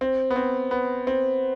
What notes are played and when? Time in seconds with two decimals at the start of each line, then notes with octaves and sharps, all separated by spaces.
0.01 C4
0.31 B3
0.36 C4
0.71 B3
1.07 C4